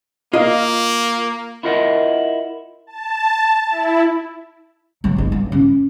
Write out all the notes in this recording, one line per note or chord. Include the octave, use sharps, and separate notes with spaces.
A#3 F4 D#5
E4 F4 A#4 D#5 F#5
A5
E4
F#3
G1 D#4
G2
C#4